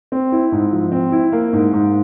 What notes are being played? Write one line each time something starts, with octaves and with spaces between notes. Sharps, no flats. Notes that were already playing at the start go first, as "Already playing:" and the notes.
C4
E4
G#2
F3
C4
E4
A#3
G#2
G#2